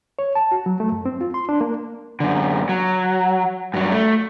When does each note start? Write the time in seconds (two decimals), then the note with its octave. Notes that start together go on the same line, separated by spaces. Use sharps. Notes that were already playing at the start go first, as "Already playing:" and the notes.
0.19 C#5
0.35 A5
0.52 F#4
0.66 F#3
0.80 A3
0.92 F#2
1.06 C4
1.21 F4
1.34 C6
1.49 D4
1.61 A#3
2.20 F#2 D3
2.69 F#3
3.74 G2 F#3
3.92 A3